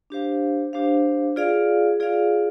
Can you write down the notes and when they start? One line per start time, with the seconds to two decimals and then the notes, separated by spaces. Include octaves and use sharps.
0.10 D4 G4 C5 F5
0.73 D4 G4 C5 F5
1.36 F4 G#4 D5 F5
2.00 F4 G#4 D5 F5